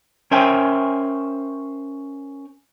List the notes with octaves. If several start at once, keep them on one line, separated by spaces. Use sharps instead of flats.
C#4 A#4 C5 E5 G5 G#5